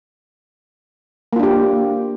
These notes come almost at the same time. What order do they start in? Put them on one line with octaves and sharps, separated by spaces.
A#3 F4 D4 G4